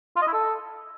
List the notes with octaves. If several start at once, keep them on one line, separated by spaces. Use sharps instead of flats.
F4
D#5
E4
A4